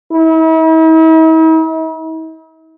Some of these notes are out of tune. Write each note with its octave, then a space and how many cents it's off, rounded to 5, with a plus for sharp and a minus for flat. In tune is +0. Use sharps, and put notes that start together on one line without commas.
E4 -45